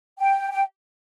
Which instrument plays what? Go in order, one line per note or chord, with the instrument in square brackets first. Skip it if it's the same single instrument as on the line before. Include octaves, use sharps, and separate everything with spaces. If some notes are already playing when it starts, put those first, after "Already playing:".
[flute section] G5
G5